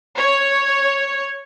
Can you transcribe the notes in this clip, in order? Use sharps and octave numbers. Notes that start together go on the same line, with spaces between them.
C#5